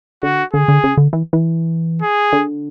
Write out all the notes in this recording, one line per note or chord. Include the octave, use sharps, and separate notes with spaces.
D3 F#4
D3 G#4
D3
C#3
D3
E3
E3
G#4
D3